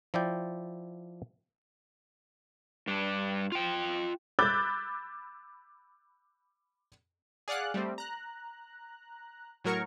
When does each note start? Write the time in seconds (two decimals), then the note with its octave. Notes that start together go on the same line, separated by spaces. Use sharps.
0.14 F3 E4 D5 G5
2.87 G2 D4
3.52 F4 G5
4.39 B5 D6 E6 F#6 G6 A6
7.48 G#4 D5 F5 F#5 F#6
7.74 G3 A3 C4
7.98 A#5 F#6
9.64 A2 F#3 F#4 A#4 C#5 C#6